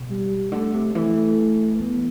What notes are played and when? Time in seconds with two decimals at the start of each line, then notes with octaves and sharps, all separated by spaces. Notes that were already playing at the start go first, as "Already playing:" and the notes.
Already playing: B2
0.10 G3
0.52 D3 A3
0.74 C3
0.94 E3 A3
1.79 E3 B3